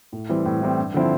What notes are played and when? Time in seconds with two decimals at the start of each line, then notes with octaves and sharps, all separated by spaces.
0.13 A2
0.29 E3 G3 C4
0.46 A2
0.62 E3 G3 C4
0.78 G2
0.94 D3 F3 C4 E4